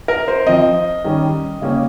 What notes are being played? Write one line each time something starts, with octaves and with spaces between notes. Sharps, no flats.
A#4
C5
F3 C4 D#5
D#3 G3 C#4
C#3 G3 A#3 C#4